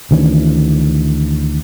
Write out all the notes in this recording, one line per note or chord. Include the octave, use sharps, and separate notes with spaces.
D2 D#3 E3 C#4